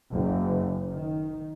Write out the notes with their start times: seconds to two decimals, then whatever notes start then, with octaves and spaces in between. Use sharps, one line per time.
0.12 F#1
0.91 D#3